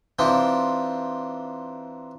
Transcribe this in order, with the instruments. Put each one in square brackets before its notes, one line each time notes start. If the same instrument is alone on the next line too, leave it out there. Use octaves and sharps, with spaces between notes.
[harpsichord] E3 C4 D4 D#4 F4 G4